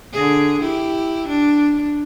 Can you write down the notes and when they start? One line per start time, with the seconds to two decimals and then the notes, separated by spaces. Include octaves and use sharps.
0.13 D3 G#4
0.61 E4 G4
1.28 D4